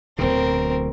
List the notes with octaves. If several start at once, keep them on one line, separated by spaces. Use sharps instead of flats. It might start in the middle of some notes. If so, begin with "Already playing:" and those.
D1 G1 B2 C4 A#4